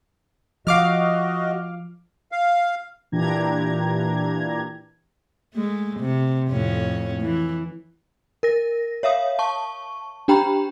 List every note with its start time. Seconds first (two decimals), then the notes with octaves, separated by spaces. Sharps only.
0.67 F3 F#4 D#5 F5 D6 F6
2.32 F5
3.12 A#2 E3 D4 G4 A#5 G#6
5.54 G#3 A3
6.00 C3
6.50 F2 A2 C#4
7.22 E3
8.43 A#4 A#6
9.03 C#5 E5 F5 D#6
9.39 A5 C#6
10.28 D4 G4 G5 A#5 B5